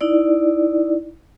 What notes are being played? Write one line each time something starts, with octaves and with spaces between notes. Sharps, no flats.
D#4 E4 D5